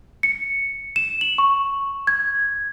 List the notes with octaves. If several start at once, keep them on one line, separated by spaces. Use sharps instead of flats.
C#7
E7
F#7
C#6
G#6